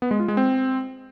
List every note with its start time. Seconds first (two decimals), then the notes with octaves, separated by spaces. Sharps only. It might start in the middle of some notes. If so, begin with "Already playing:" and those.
0.02 B3
0.11 G#3
0.20 F4
0.28 G#3
0.37 C4